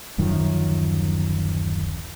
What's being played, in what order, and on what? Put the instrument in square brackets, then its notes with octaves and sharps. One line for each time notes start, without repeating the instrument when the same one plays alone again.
[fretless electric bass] D1 F#2 D#3 F3